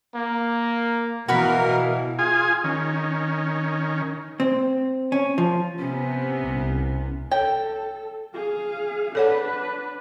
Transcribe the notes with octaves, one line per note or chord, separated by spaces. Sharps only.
A#3
B2 E3 F#4 A#4 F5 B5
F4 G#4 G#5
D#3 C#4
C4
C#4
F3
C3 B3 C#4
C2
A4 C#5 G5
G#4 F5
D4 A4 B4 C#5 F#5